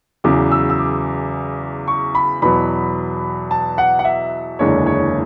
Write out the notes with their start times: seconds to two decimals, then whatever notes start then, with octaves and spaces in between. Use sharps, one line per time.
0.24 E2 C#3 F#3 D6
0.52 E6
0.70 E6
0.79 D6
1.88 C#6
2.15 B5
2.42 E2 B2 F#3 B5
3.51 A5
3.78 F#5
3.99 F#5
4.05 E5
4.59 F#1 E2 D3 G#3 C#5
4.86 C#5